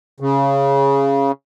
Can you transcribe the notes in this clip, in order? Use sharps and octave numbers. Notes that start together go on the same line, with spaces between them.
C#3